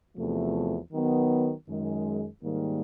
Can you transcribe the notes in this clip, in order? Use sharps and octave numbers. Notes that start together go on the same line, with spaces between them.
E2 C3 F3 A3
D#3 F#3 B3
F#2 D#3 G#3
G#2 D#3 G3 A#3